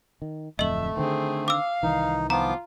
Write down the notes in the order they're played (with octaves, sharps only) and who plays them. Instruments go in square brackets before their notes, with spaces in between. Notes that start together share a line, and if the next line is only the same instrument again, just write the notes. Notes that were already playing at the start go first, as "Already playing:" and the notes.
[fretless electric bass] D#3
[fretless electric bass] D1 F2 [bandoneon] A3 [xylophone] D#5 F#7 [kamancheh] E5
[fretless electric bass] D3 D#3 [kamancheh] C4 G#4
[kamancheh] F5 [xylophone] D6 E6
[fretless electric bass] C2 D#3 E3 [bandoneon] D#4
[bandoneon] F3 B3 D6 [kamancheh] F4 [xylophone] A#5